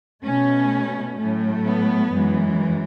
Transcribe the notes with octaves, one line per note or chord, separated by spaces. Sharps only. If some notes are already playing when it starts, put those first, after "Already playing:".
B2 A3 C#4
A2 F#3 A3
B3
F#2 E3 G#3